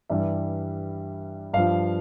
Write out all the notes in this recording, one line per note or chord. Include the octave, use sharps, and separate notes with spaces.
G2 E3 G3 E5
G2 F3 F5